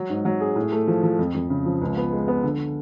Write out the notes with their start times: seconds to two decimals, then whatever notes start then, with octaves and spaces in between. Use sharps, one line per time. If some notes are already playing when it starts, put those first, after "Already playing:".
Already playing: F#3
0.09 G#2
0.25 F#3
0.40 G#4
0.56 A2
0.72 A3
0.88 F3
1.03 F3
1.19 F2
1.34 F2
1.50 C#3
1.66 F3
1.81 C#2
1.97 B3
2.12 G#3
2.28 B3
2.43 D3